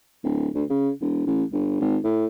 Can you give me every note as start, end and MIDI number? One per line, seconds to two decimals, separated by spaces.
0.24 0.48 26
0.55 0.64 38
0.70 0.91 49
1.01 1.24 28
1.27 1.43 33
1.53 1.76 31
1.81 1.97 32
2.04 2.26 45